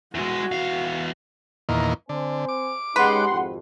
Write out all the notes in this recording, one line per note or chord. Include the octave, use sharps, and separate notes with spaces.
E2 G#3 F#4
E2 F5
E2 A#2 D#3
D3 C4 C5 G#5
D6
G#3 C#4 D#4 G4 B4 F#5 C6
G#1 F2 C3